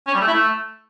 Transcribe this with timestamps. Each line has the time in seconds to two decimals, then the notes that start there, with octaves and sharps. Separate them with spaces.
0.07 C#4
0.14 G3
0.21 A3
0.27 E4
0.34 A3